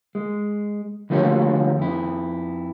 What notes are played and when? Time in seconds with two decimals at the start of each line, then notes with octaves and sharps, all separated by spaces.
0.15 G#3
1.10 D3 F3 A3 F#4 G4 C#5
1.78 F2 E4